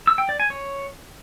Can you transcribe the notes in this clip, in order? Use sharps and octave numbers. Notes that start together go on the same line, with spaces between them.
E6
G5
D5
G#5
C#5